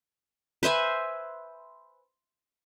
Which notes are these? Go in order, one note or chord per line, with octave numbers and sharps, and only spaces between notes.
B4 C5 E5 G#5